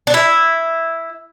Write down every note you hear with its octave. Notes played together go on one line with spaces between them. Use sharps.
D4
E4